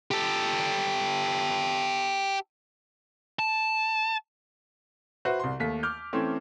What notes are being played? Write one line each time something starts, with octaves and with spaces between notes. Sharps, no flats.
G4 A4
A5
F#4 B4 C5 E5
C2 C6
D#2 A3 B6
D6 F6 G6
E3 A3 C4 C#4